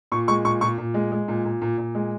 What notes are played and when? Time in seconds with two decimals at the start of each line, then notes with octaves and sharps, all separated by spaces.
0.12 A#2 C#6
0.28 G#3 C#6
0.44 A#2 C#6
0.61 A#2 C#6
0.78 A#2
0.94 G#3
1.12 G#3
1.28 A#2
1.45 A#2
1.62 A#2
1.78 A#2
1.95 G#3